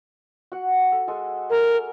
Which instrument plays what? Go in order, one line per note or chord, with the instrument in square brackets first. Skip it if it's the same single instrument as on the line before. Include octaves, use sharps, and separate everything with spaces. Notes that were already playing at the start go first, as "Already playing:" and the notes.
[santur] F#4 F#5
A4
G#3 A4 G#5
[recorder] A#4